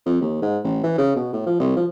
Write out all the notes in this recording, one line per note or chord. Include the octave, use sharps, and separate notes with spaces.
F2
D#2
G#2
A1
E3
C#3
B2
A2
F3
C2
F3